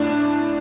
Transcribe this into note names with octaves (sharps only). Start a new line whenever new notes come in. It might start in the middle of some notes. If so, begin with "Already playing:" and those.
Already playing: A2 D4